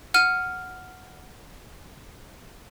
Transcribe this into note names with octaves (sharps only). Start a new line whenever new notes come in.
F#5 F6 D#7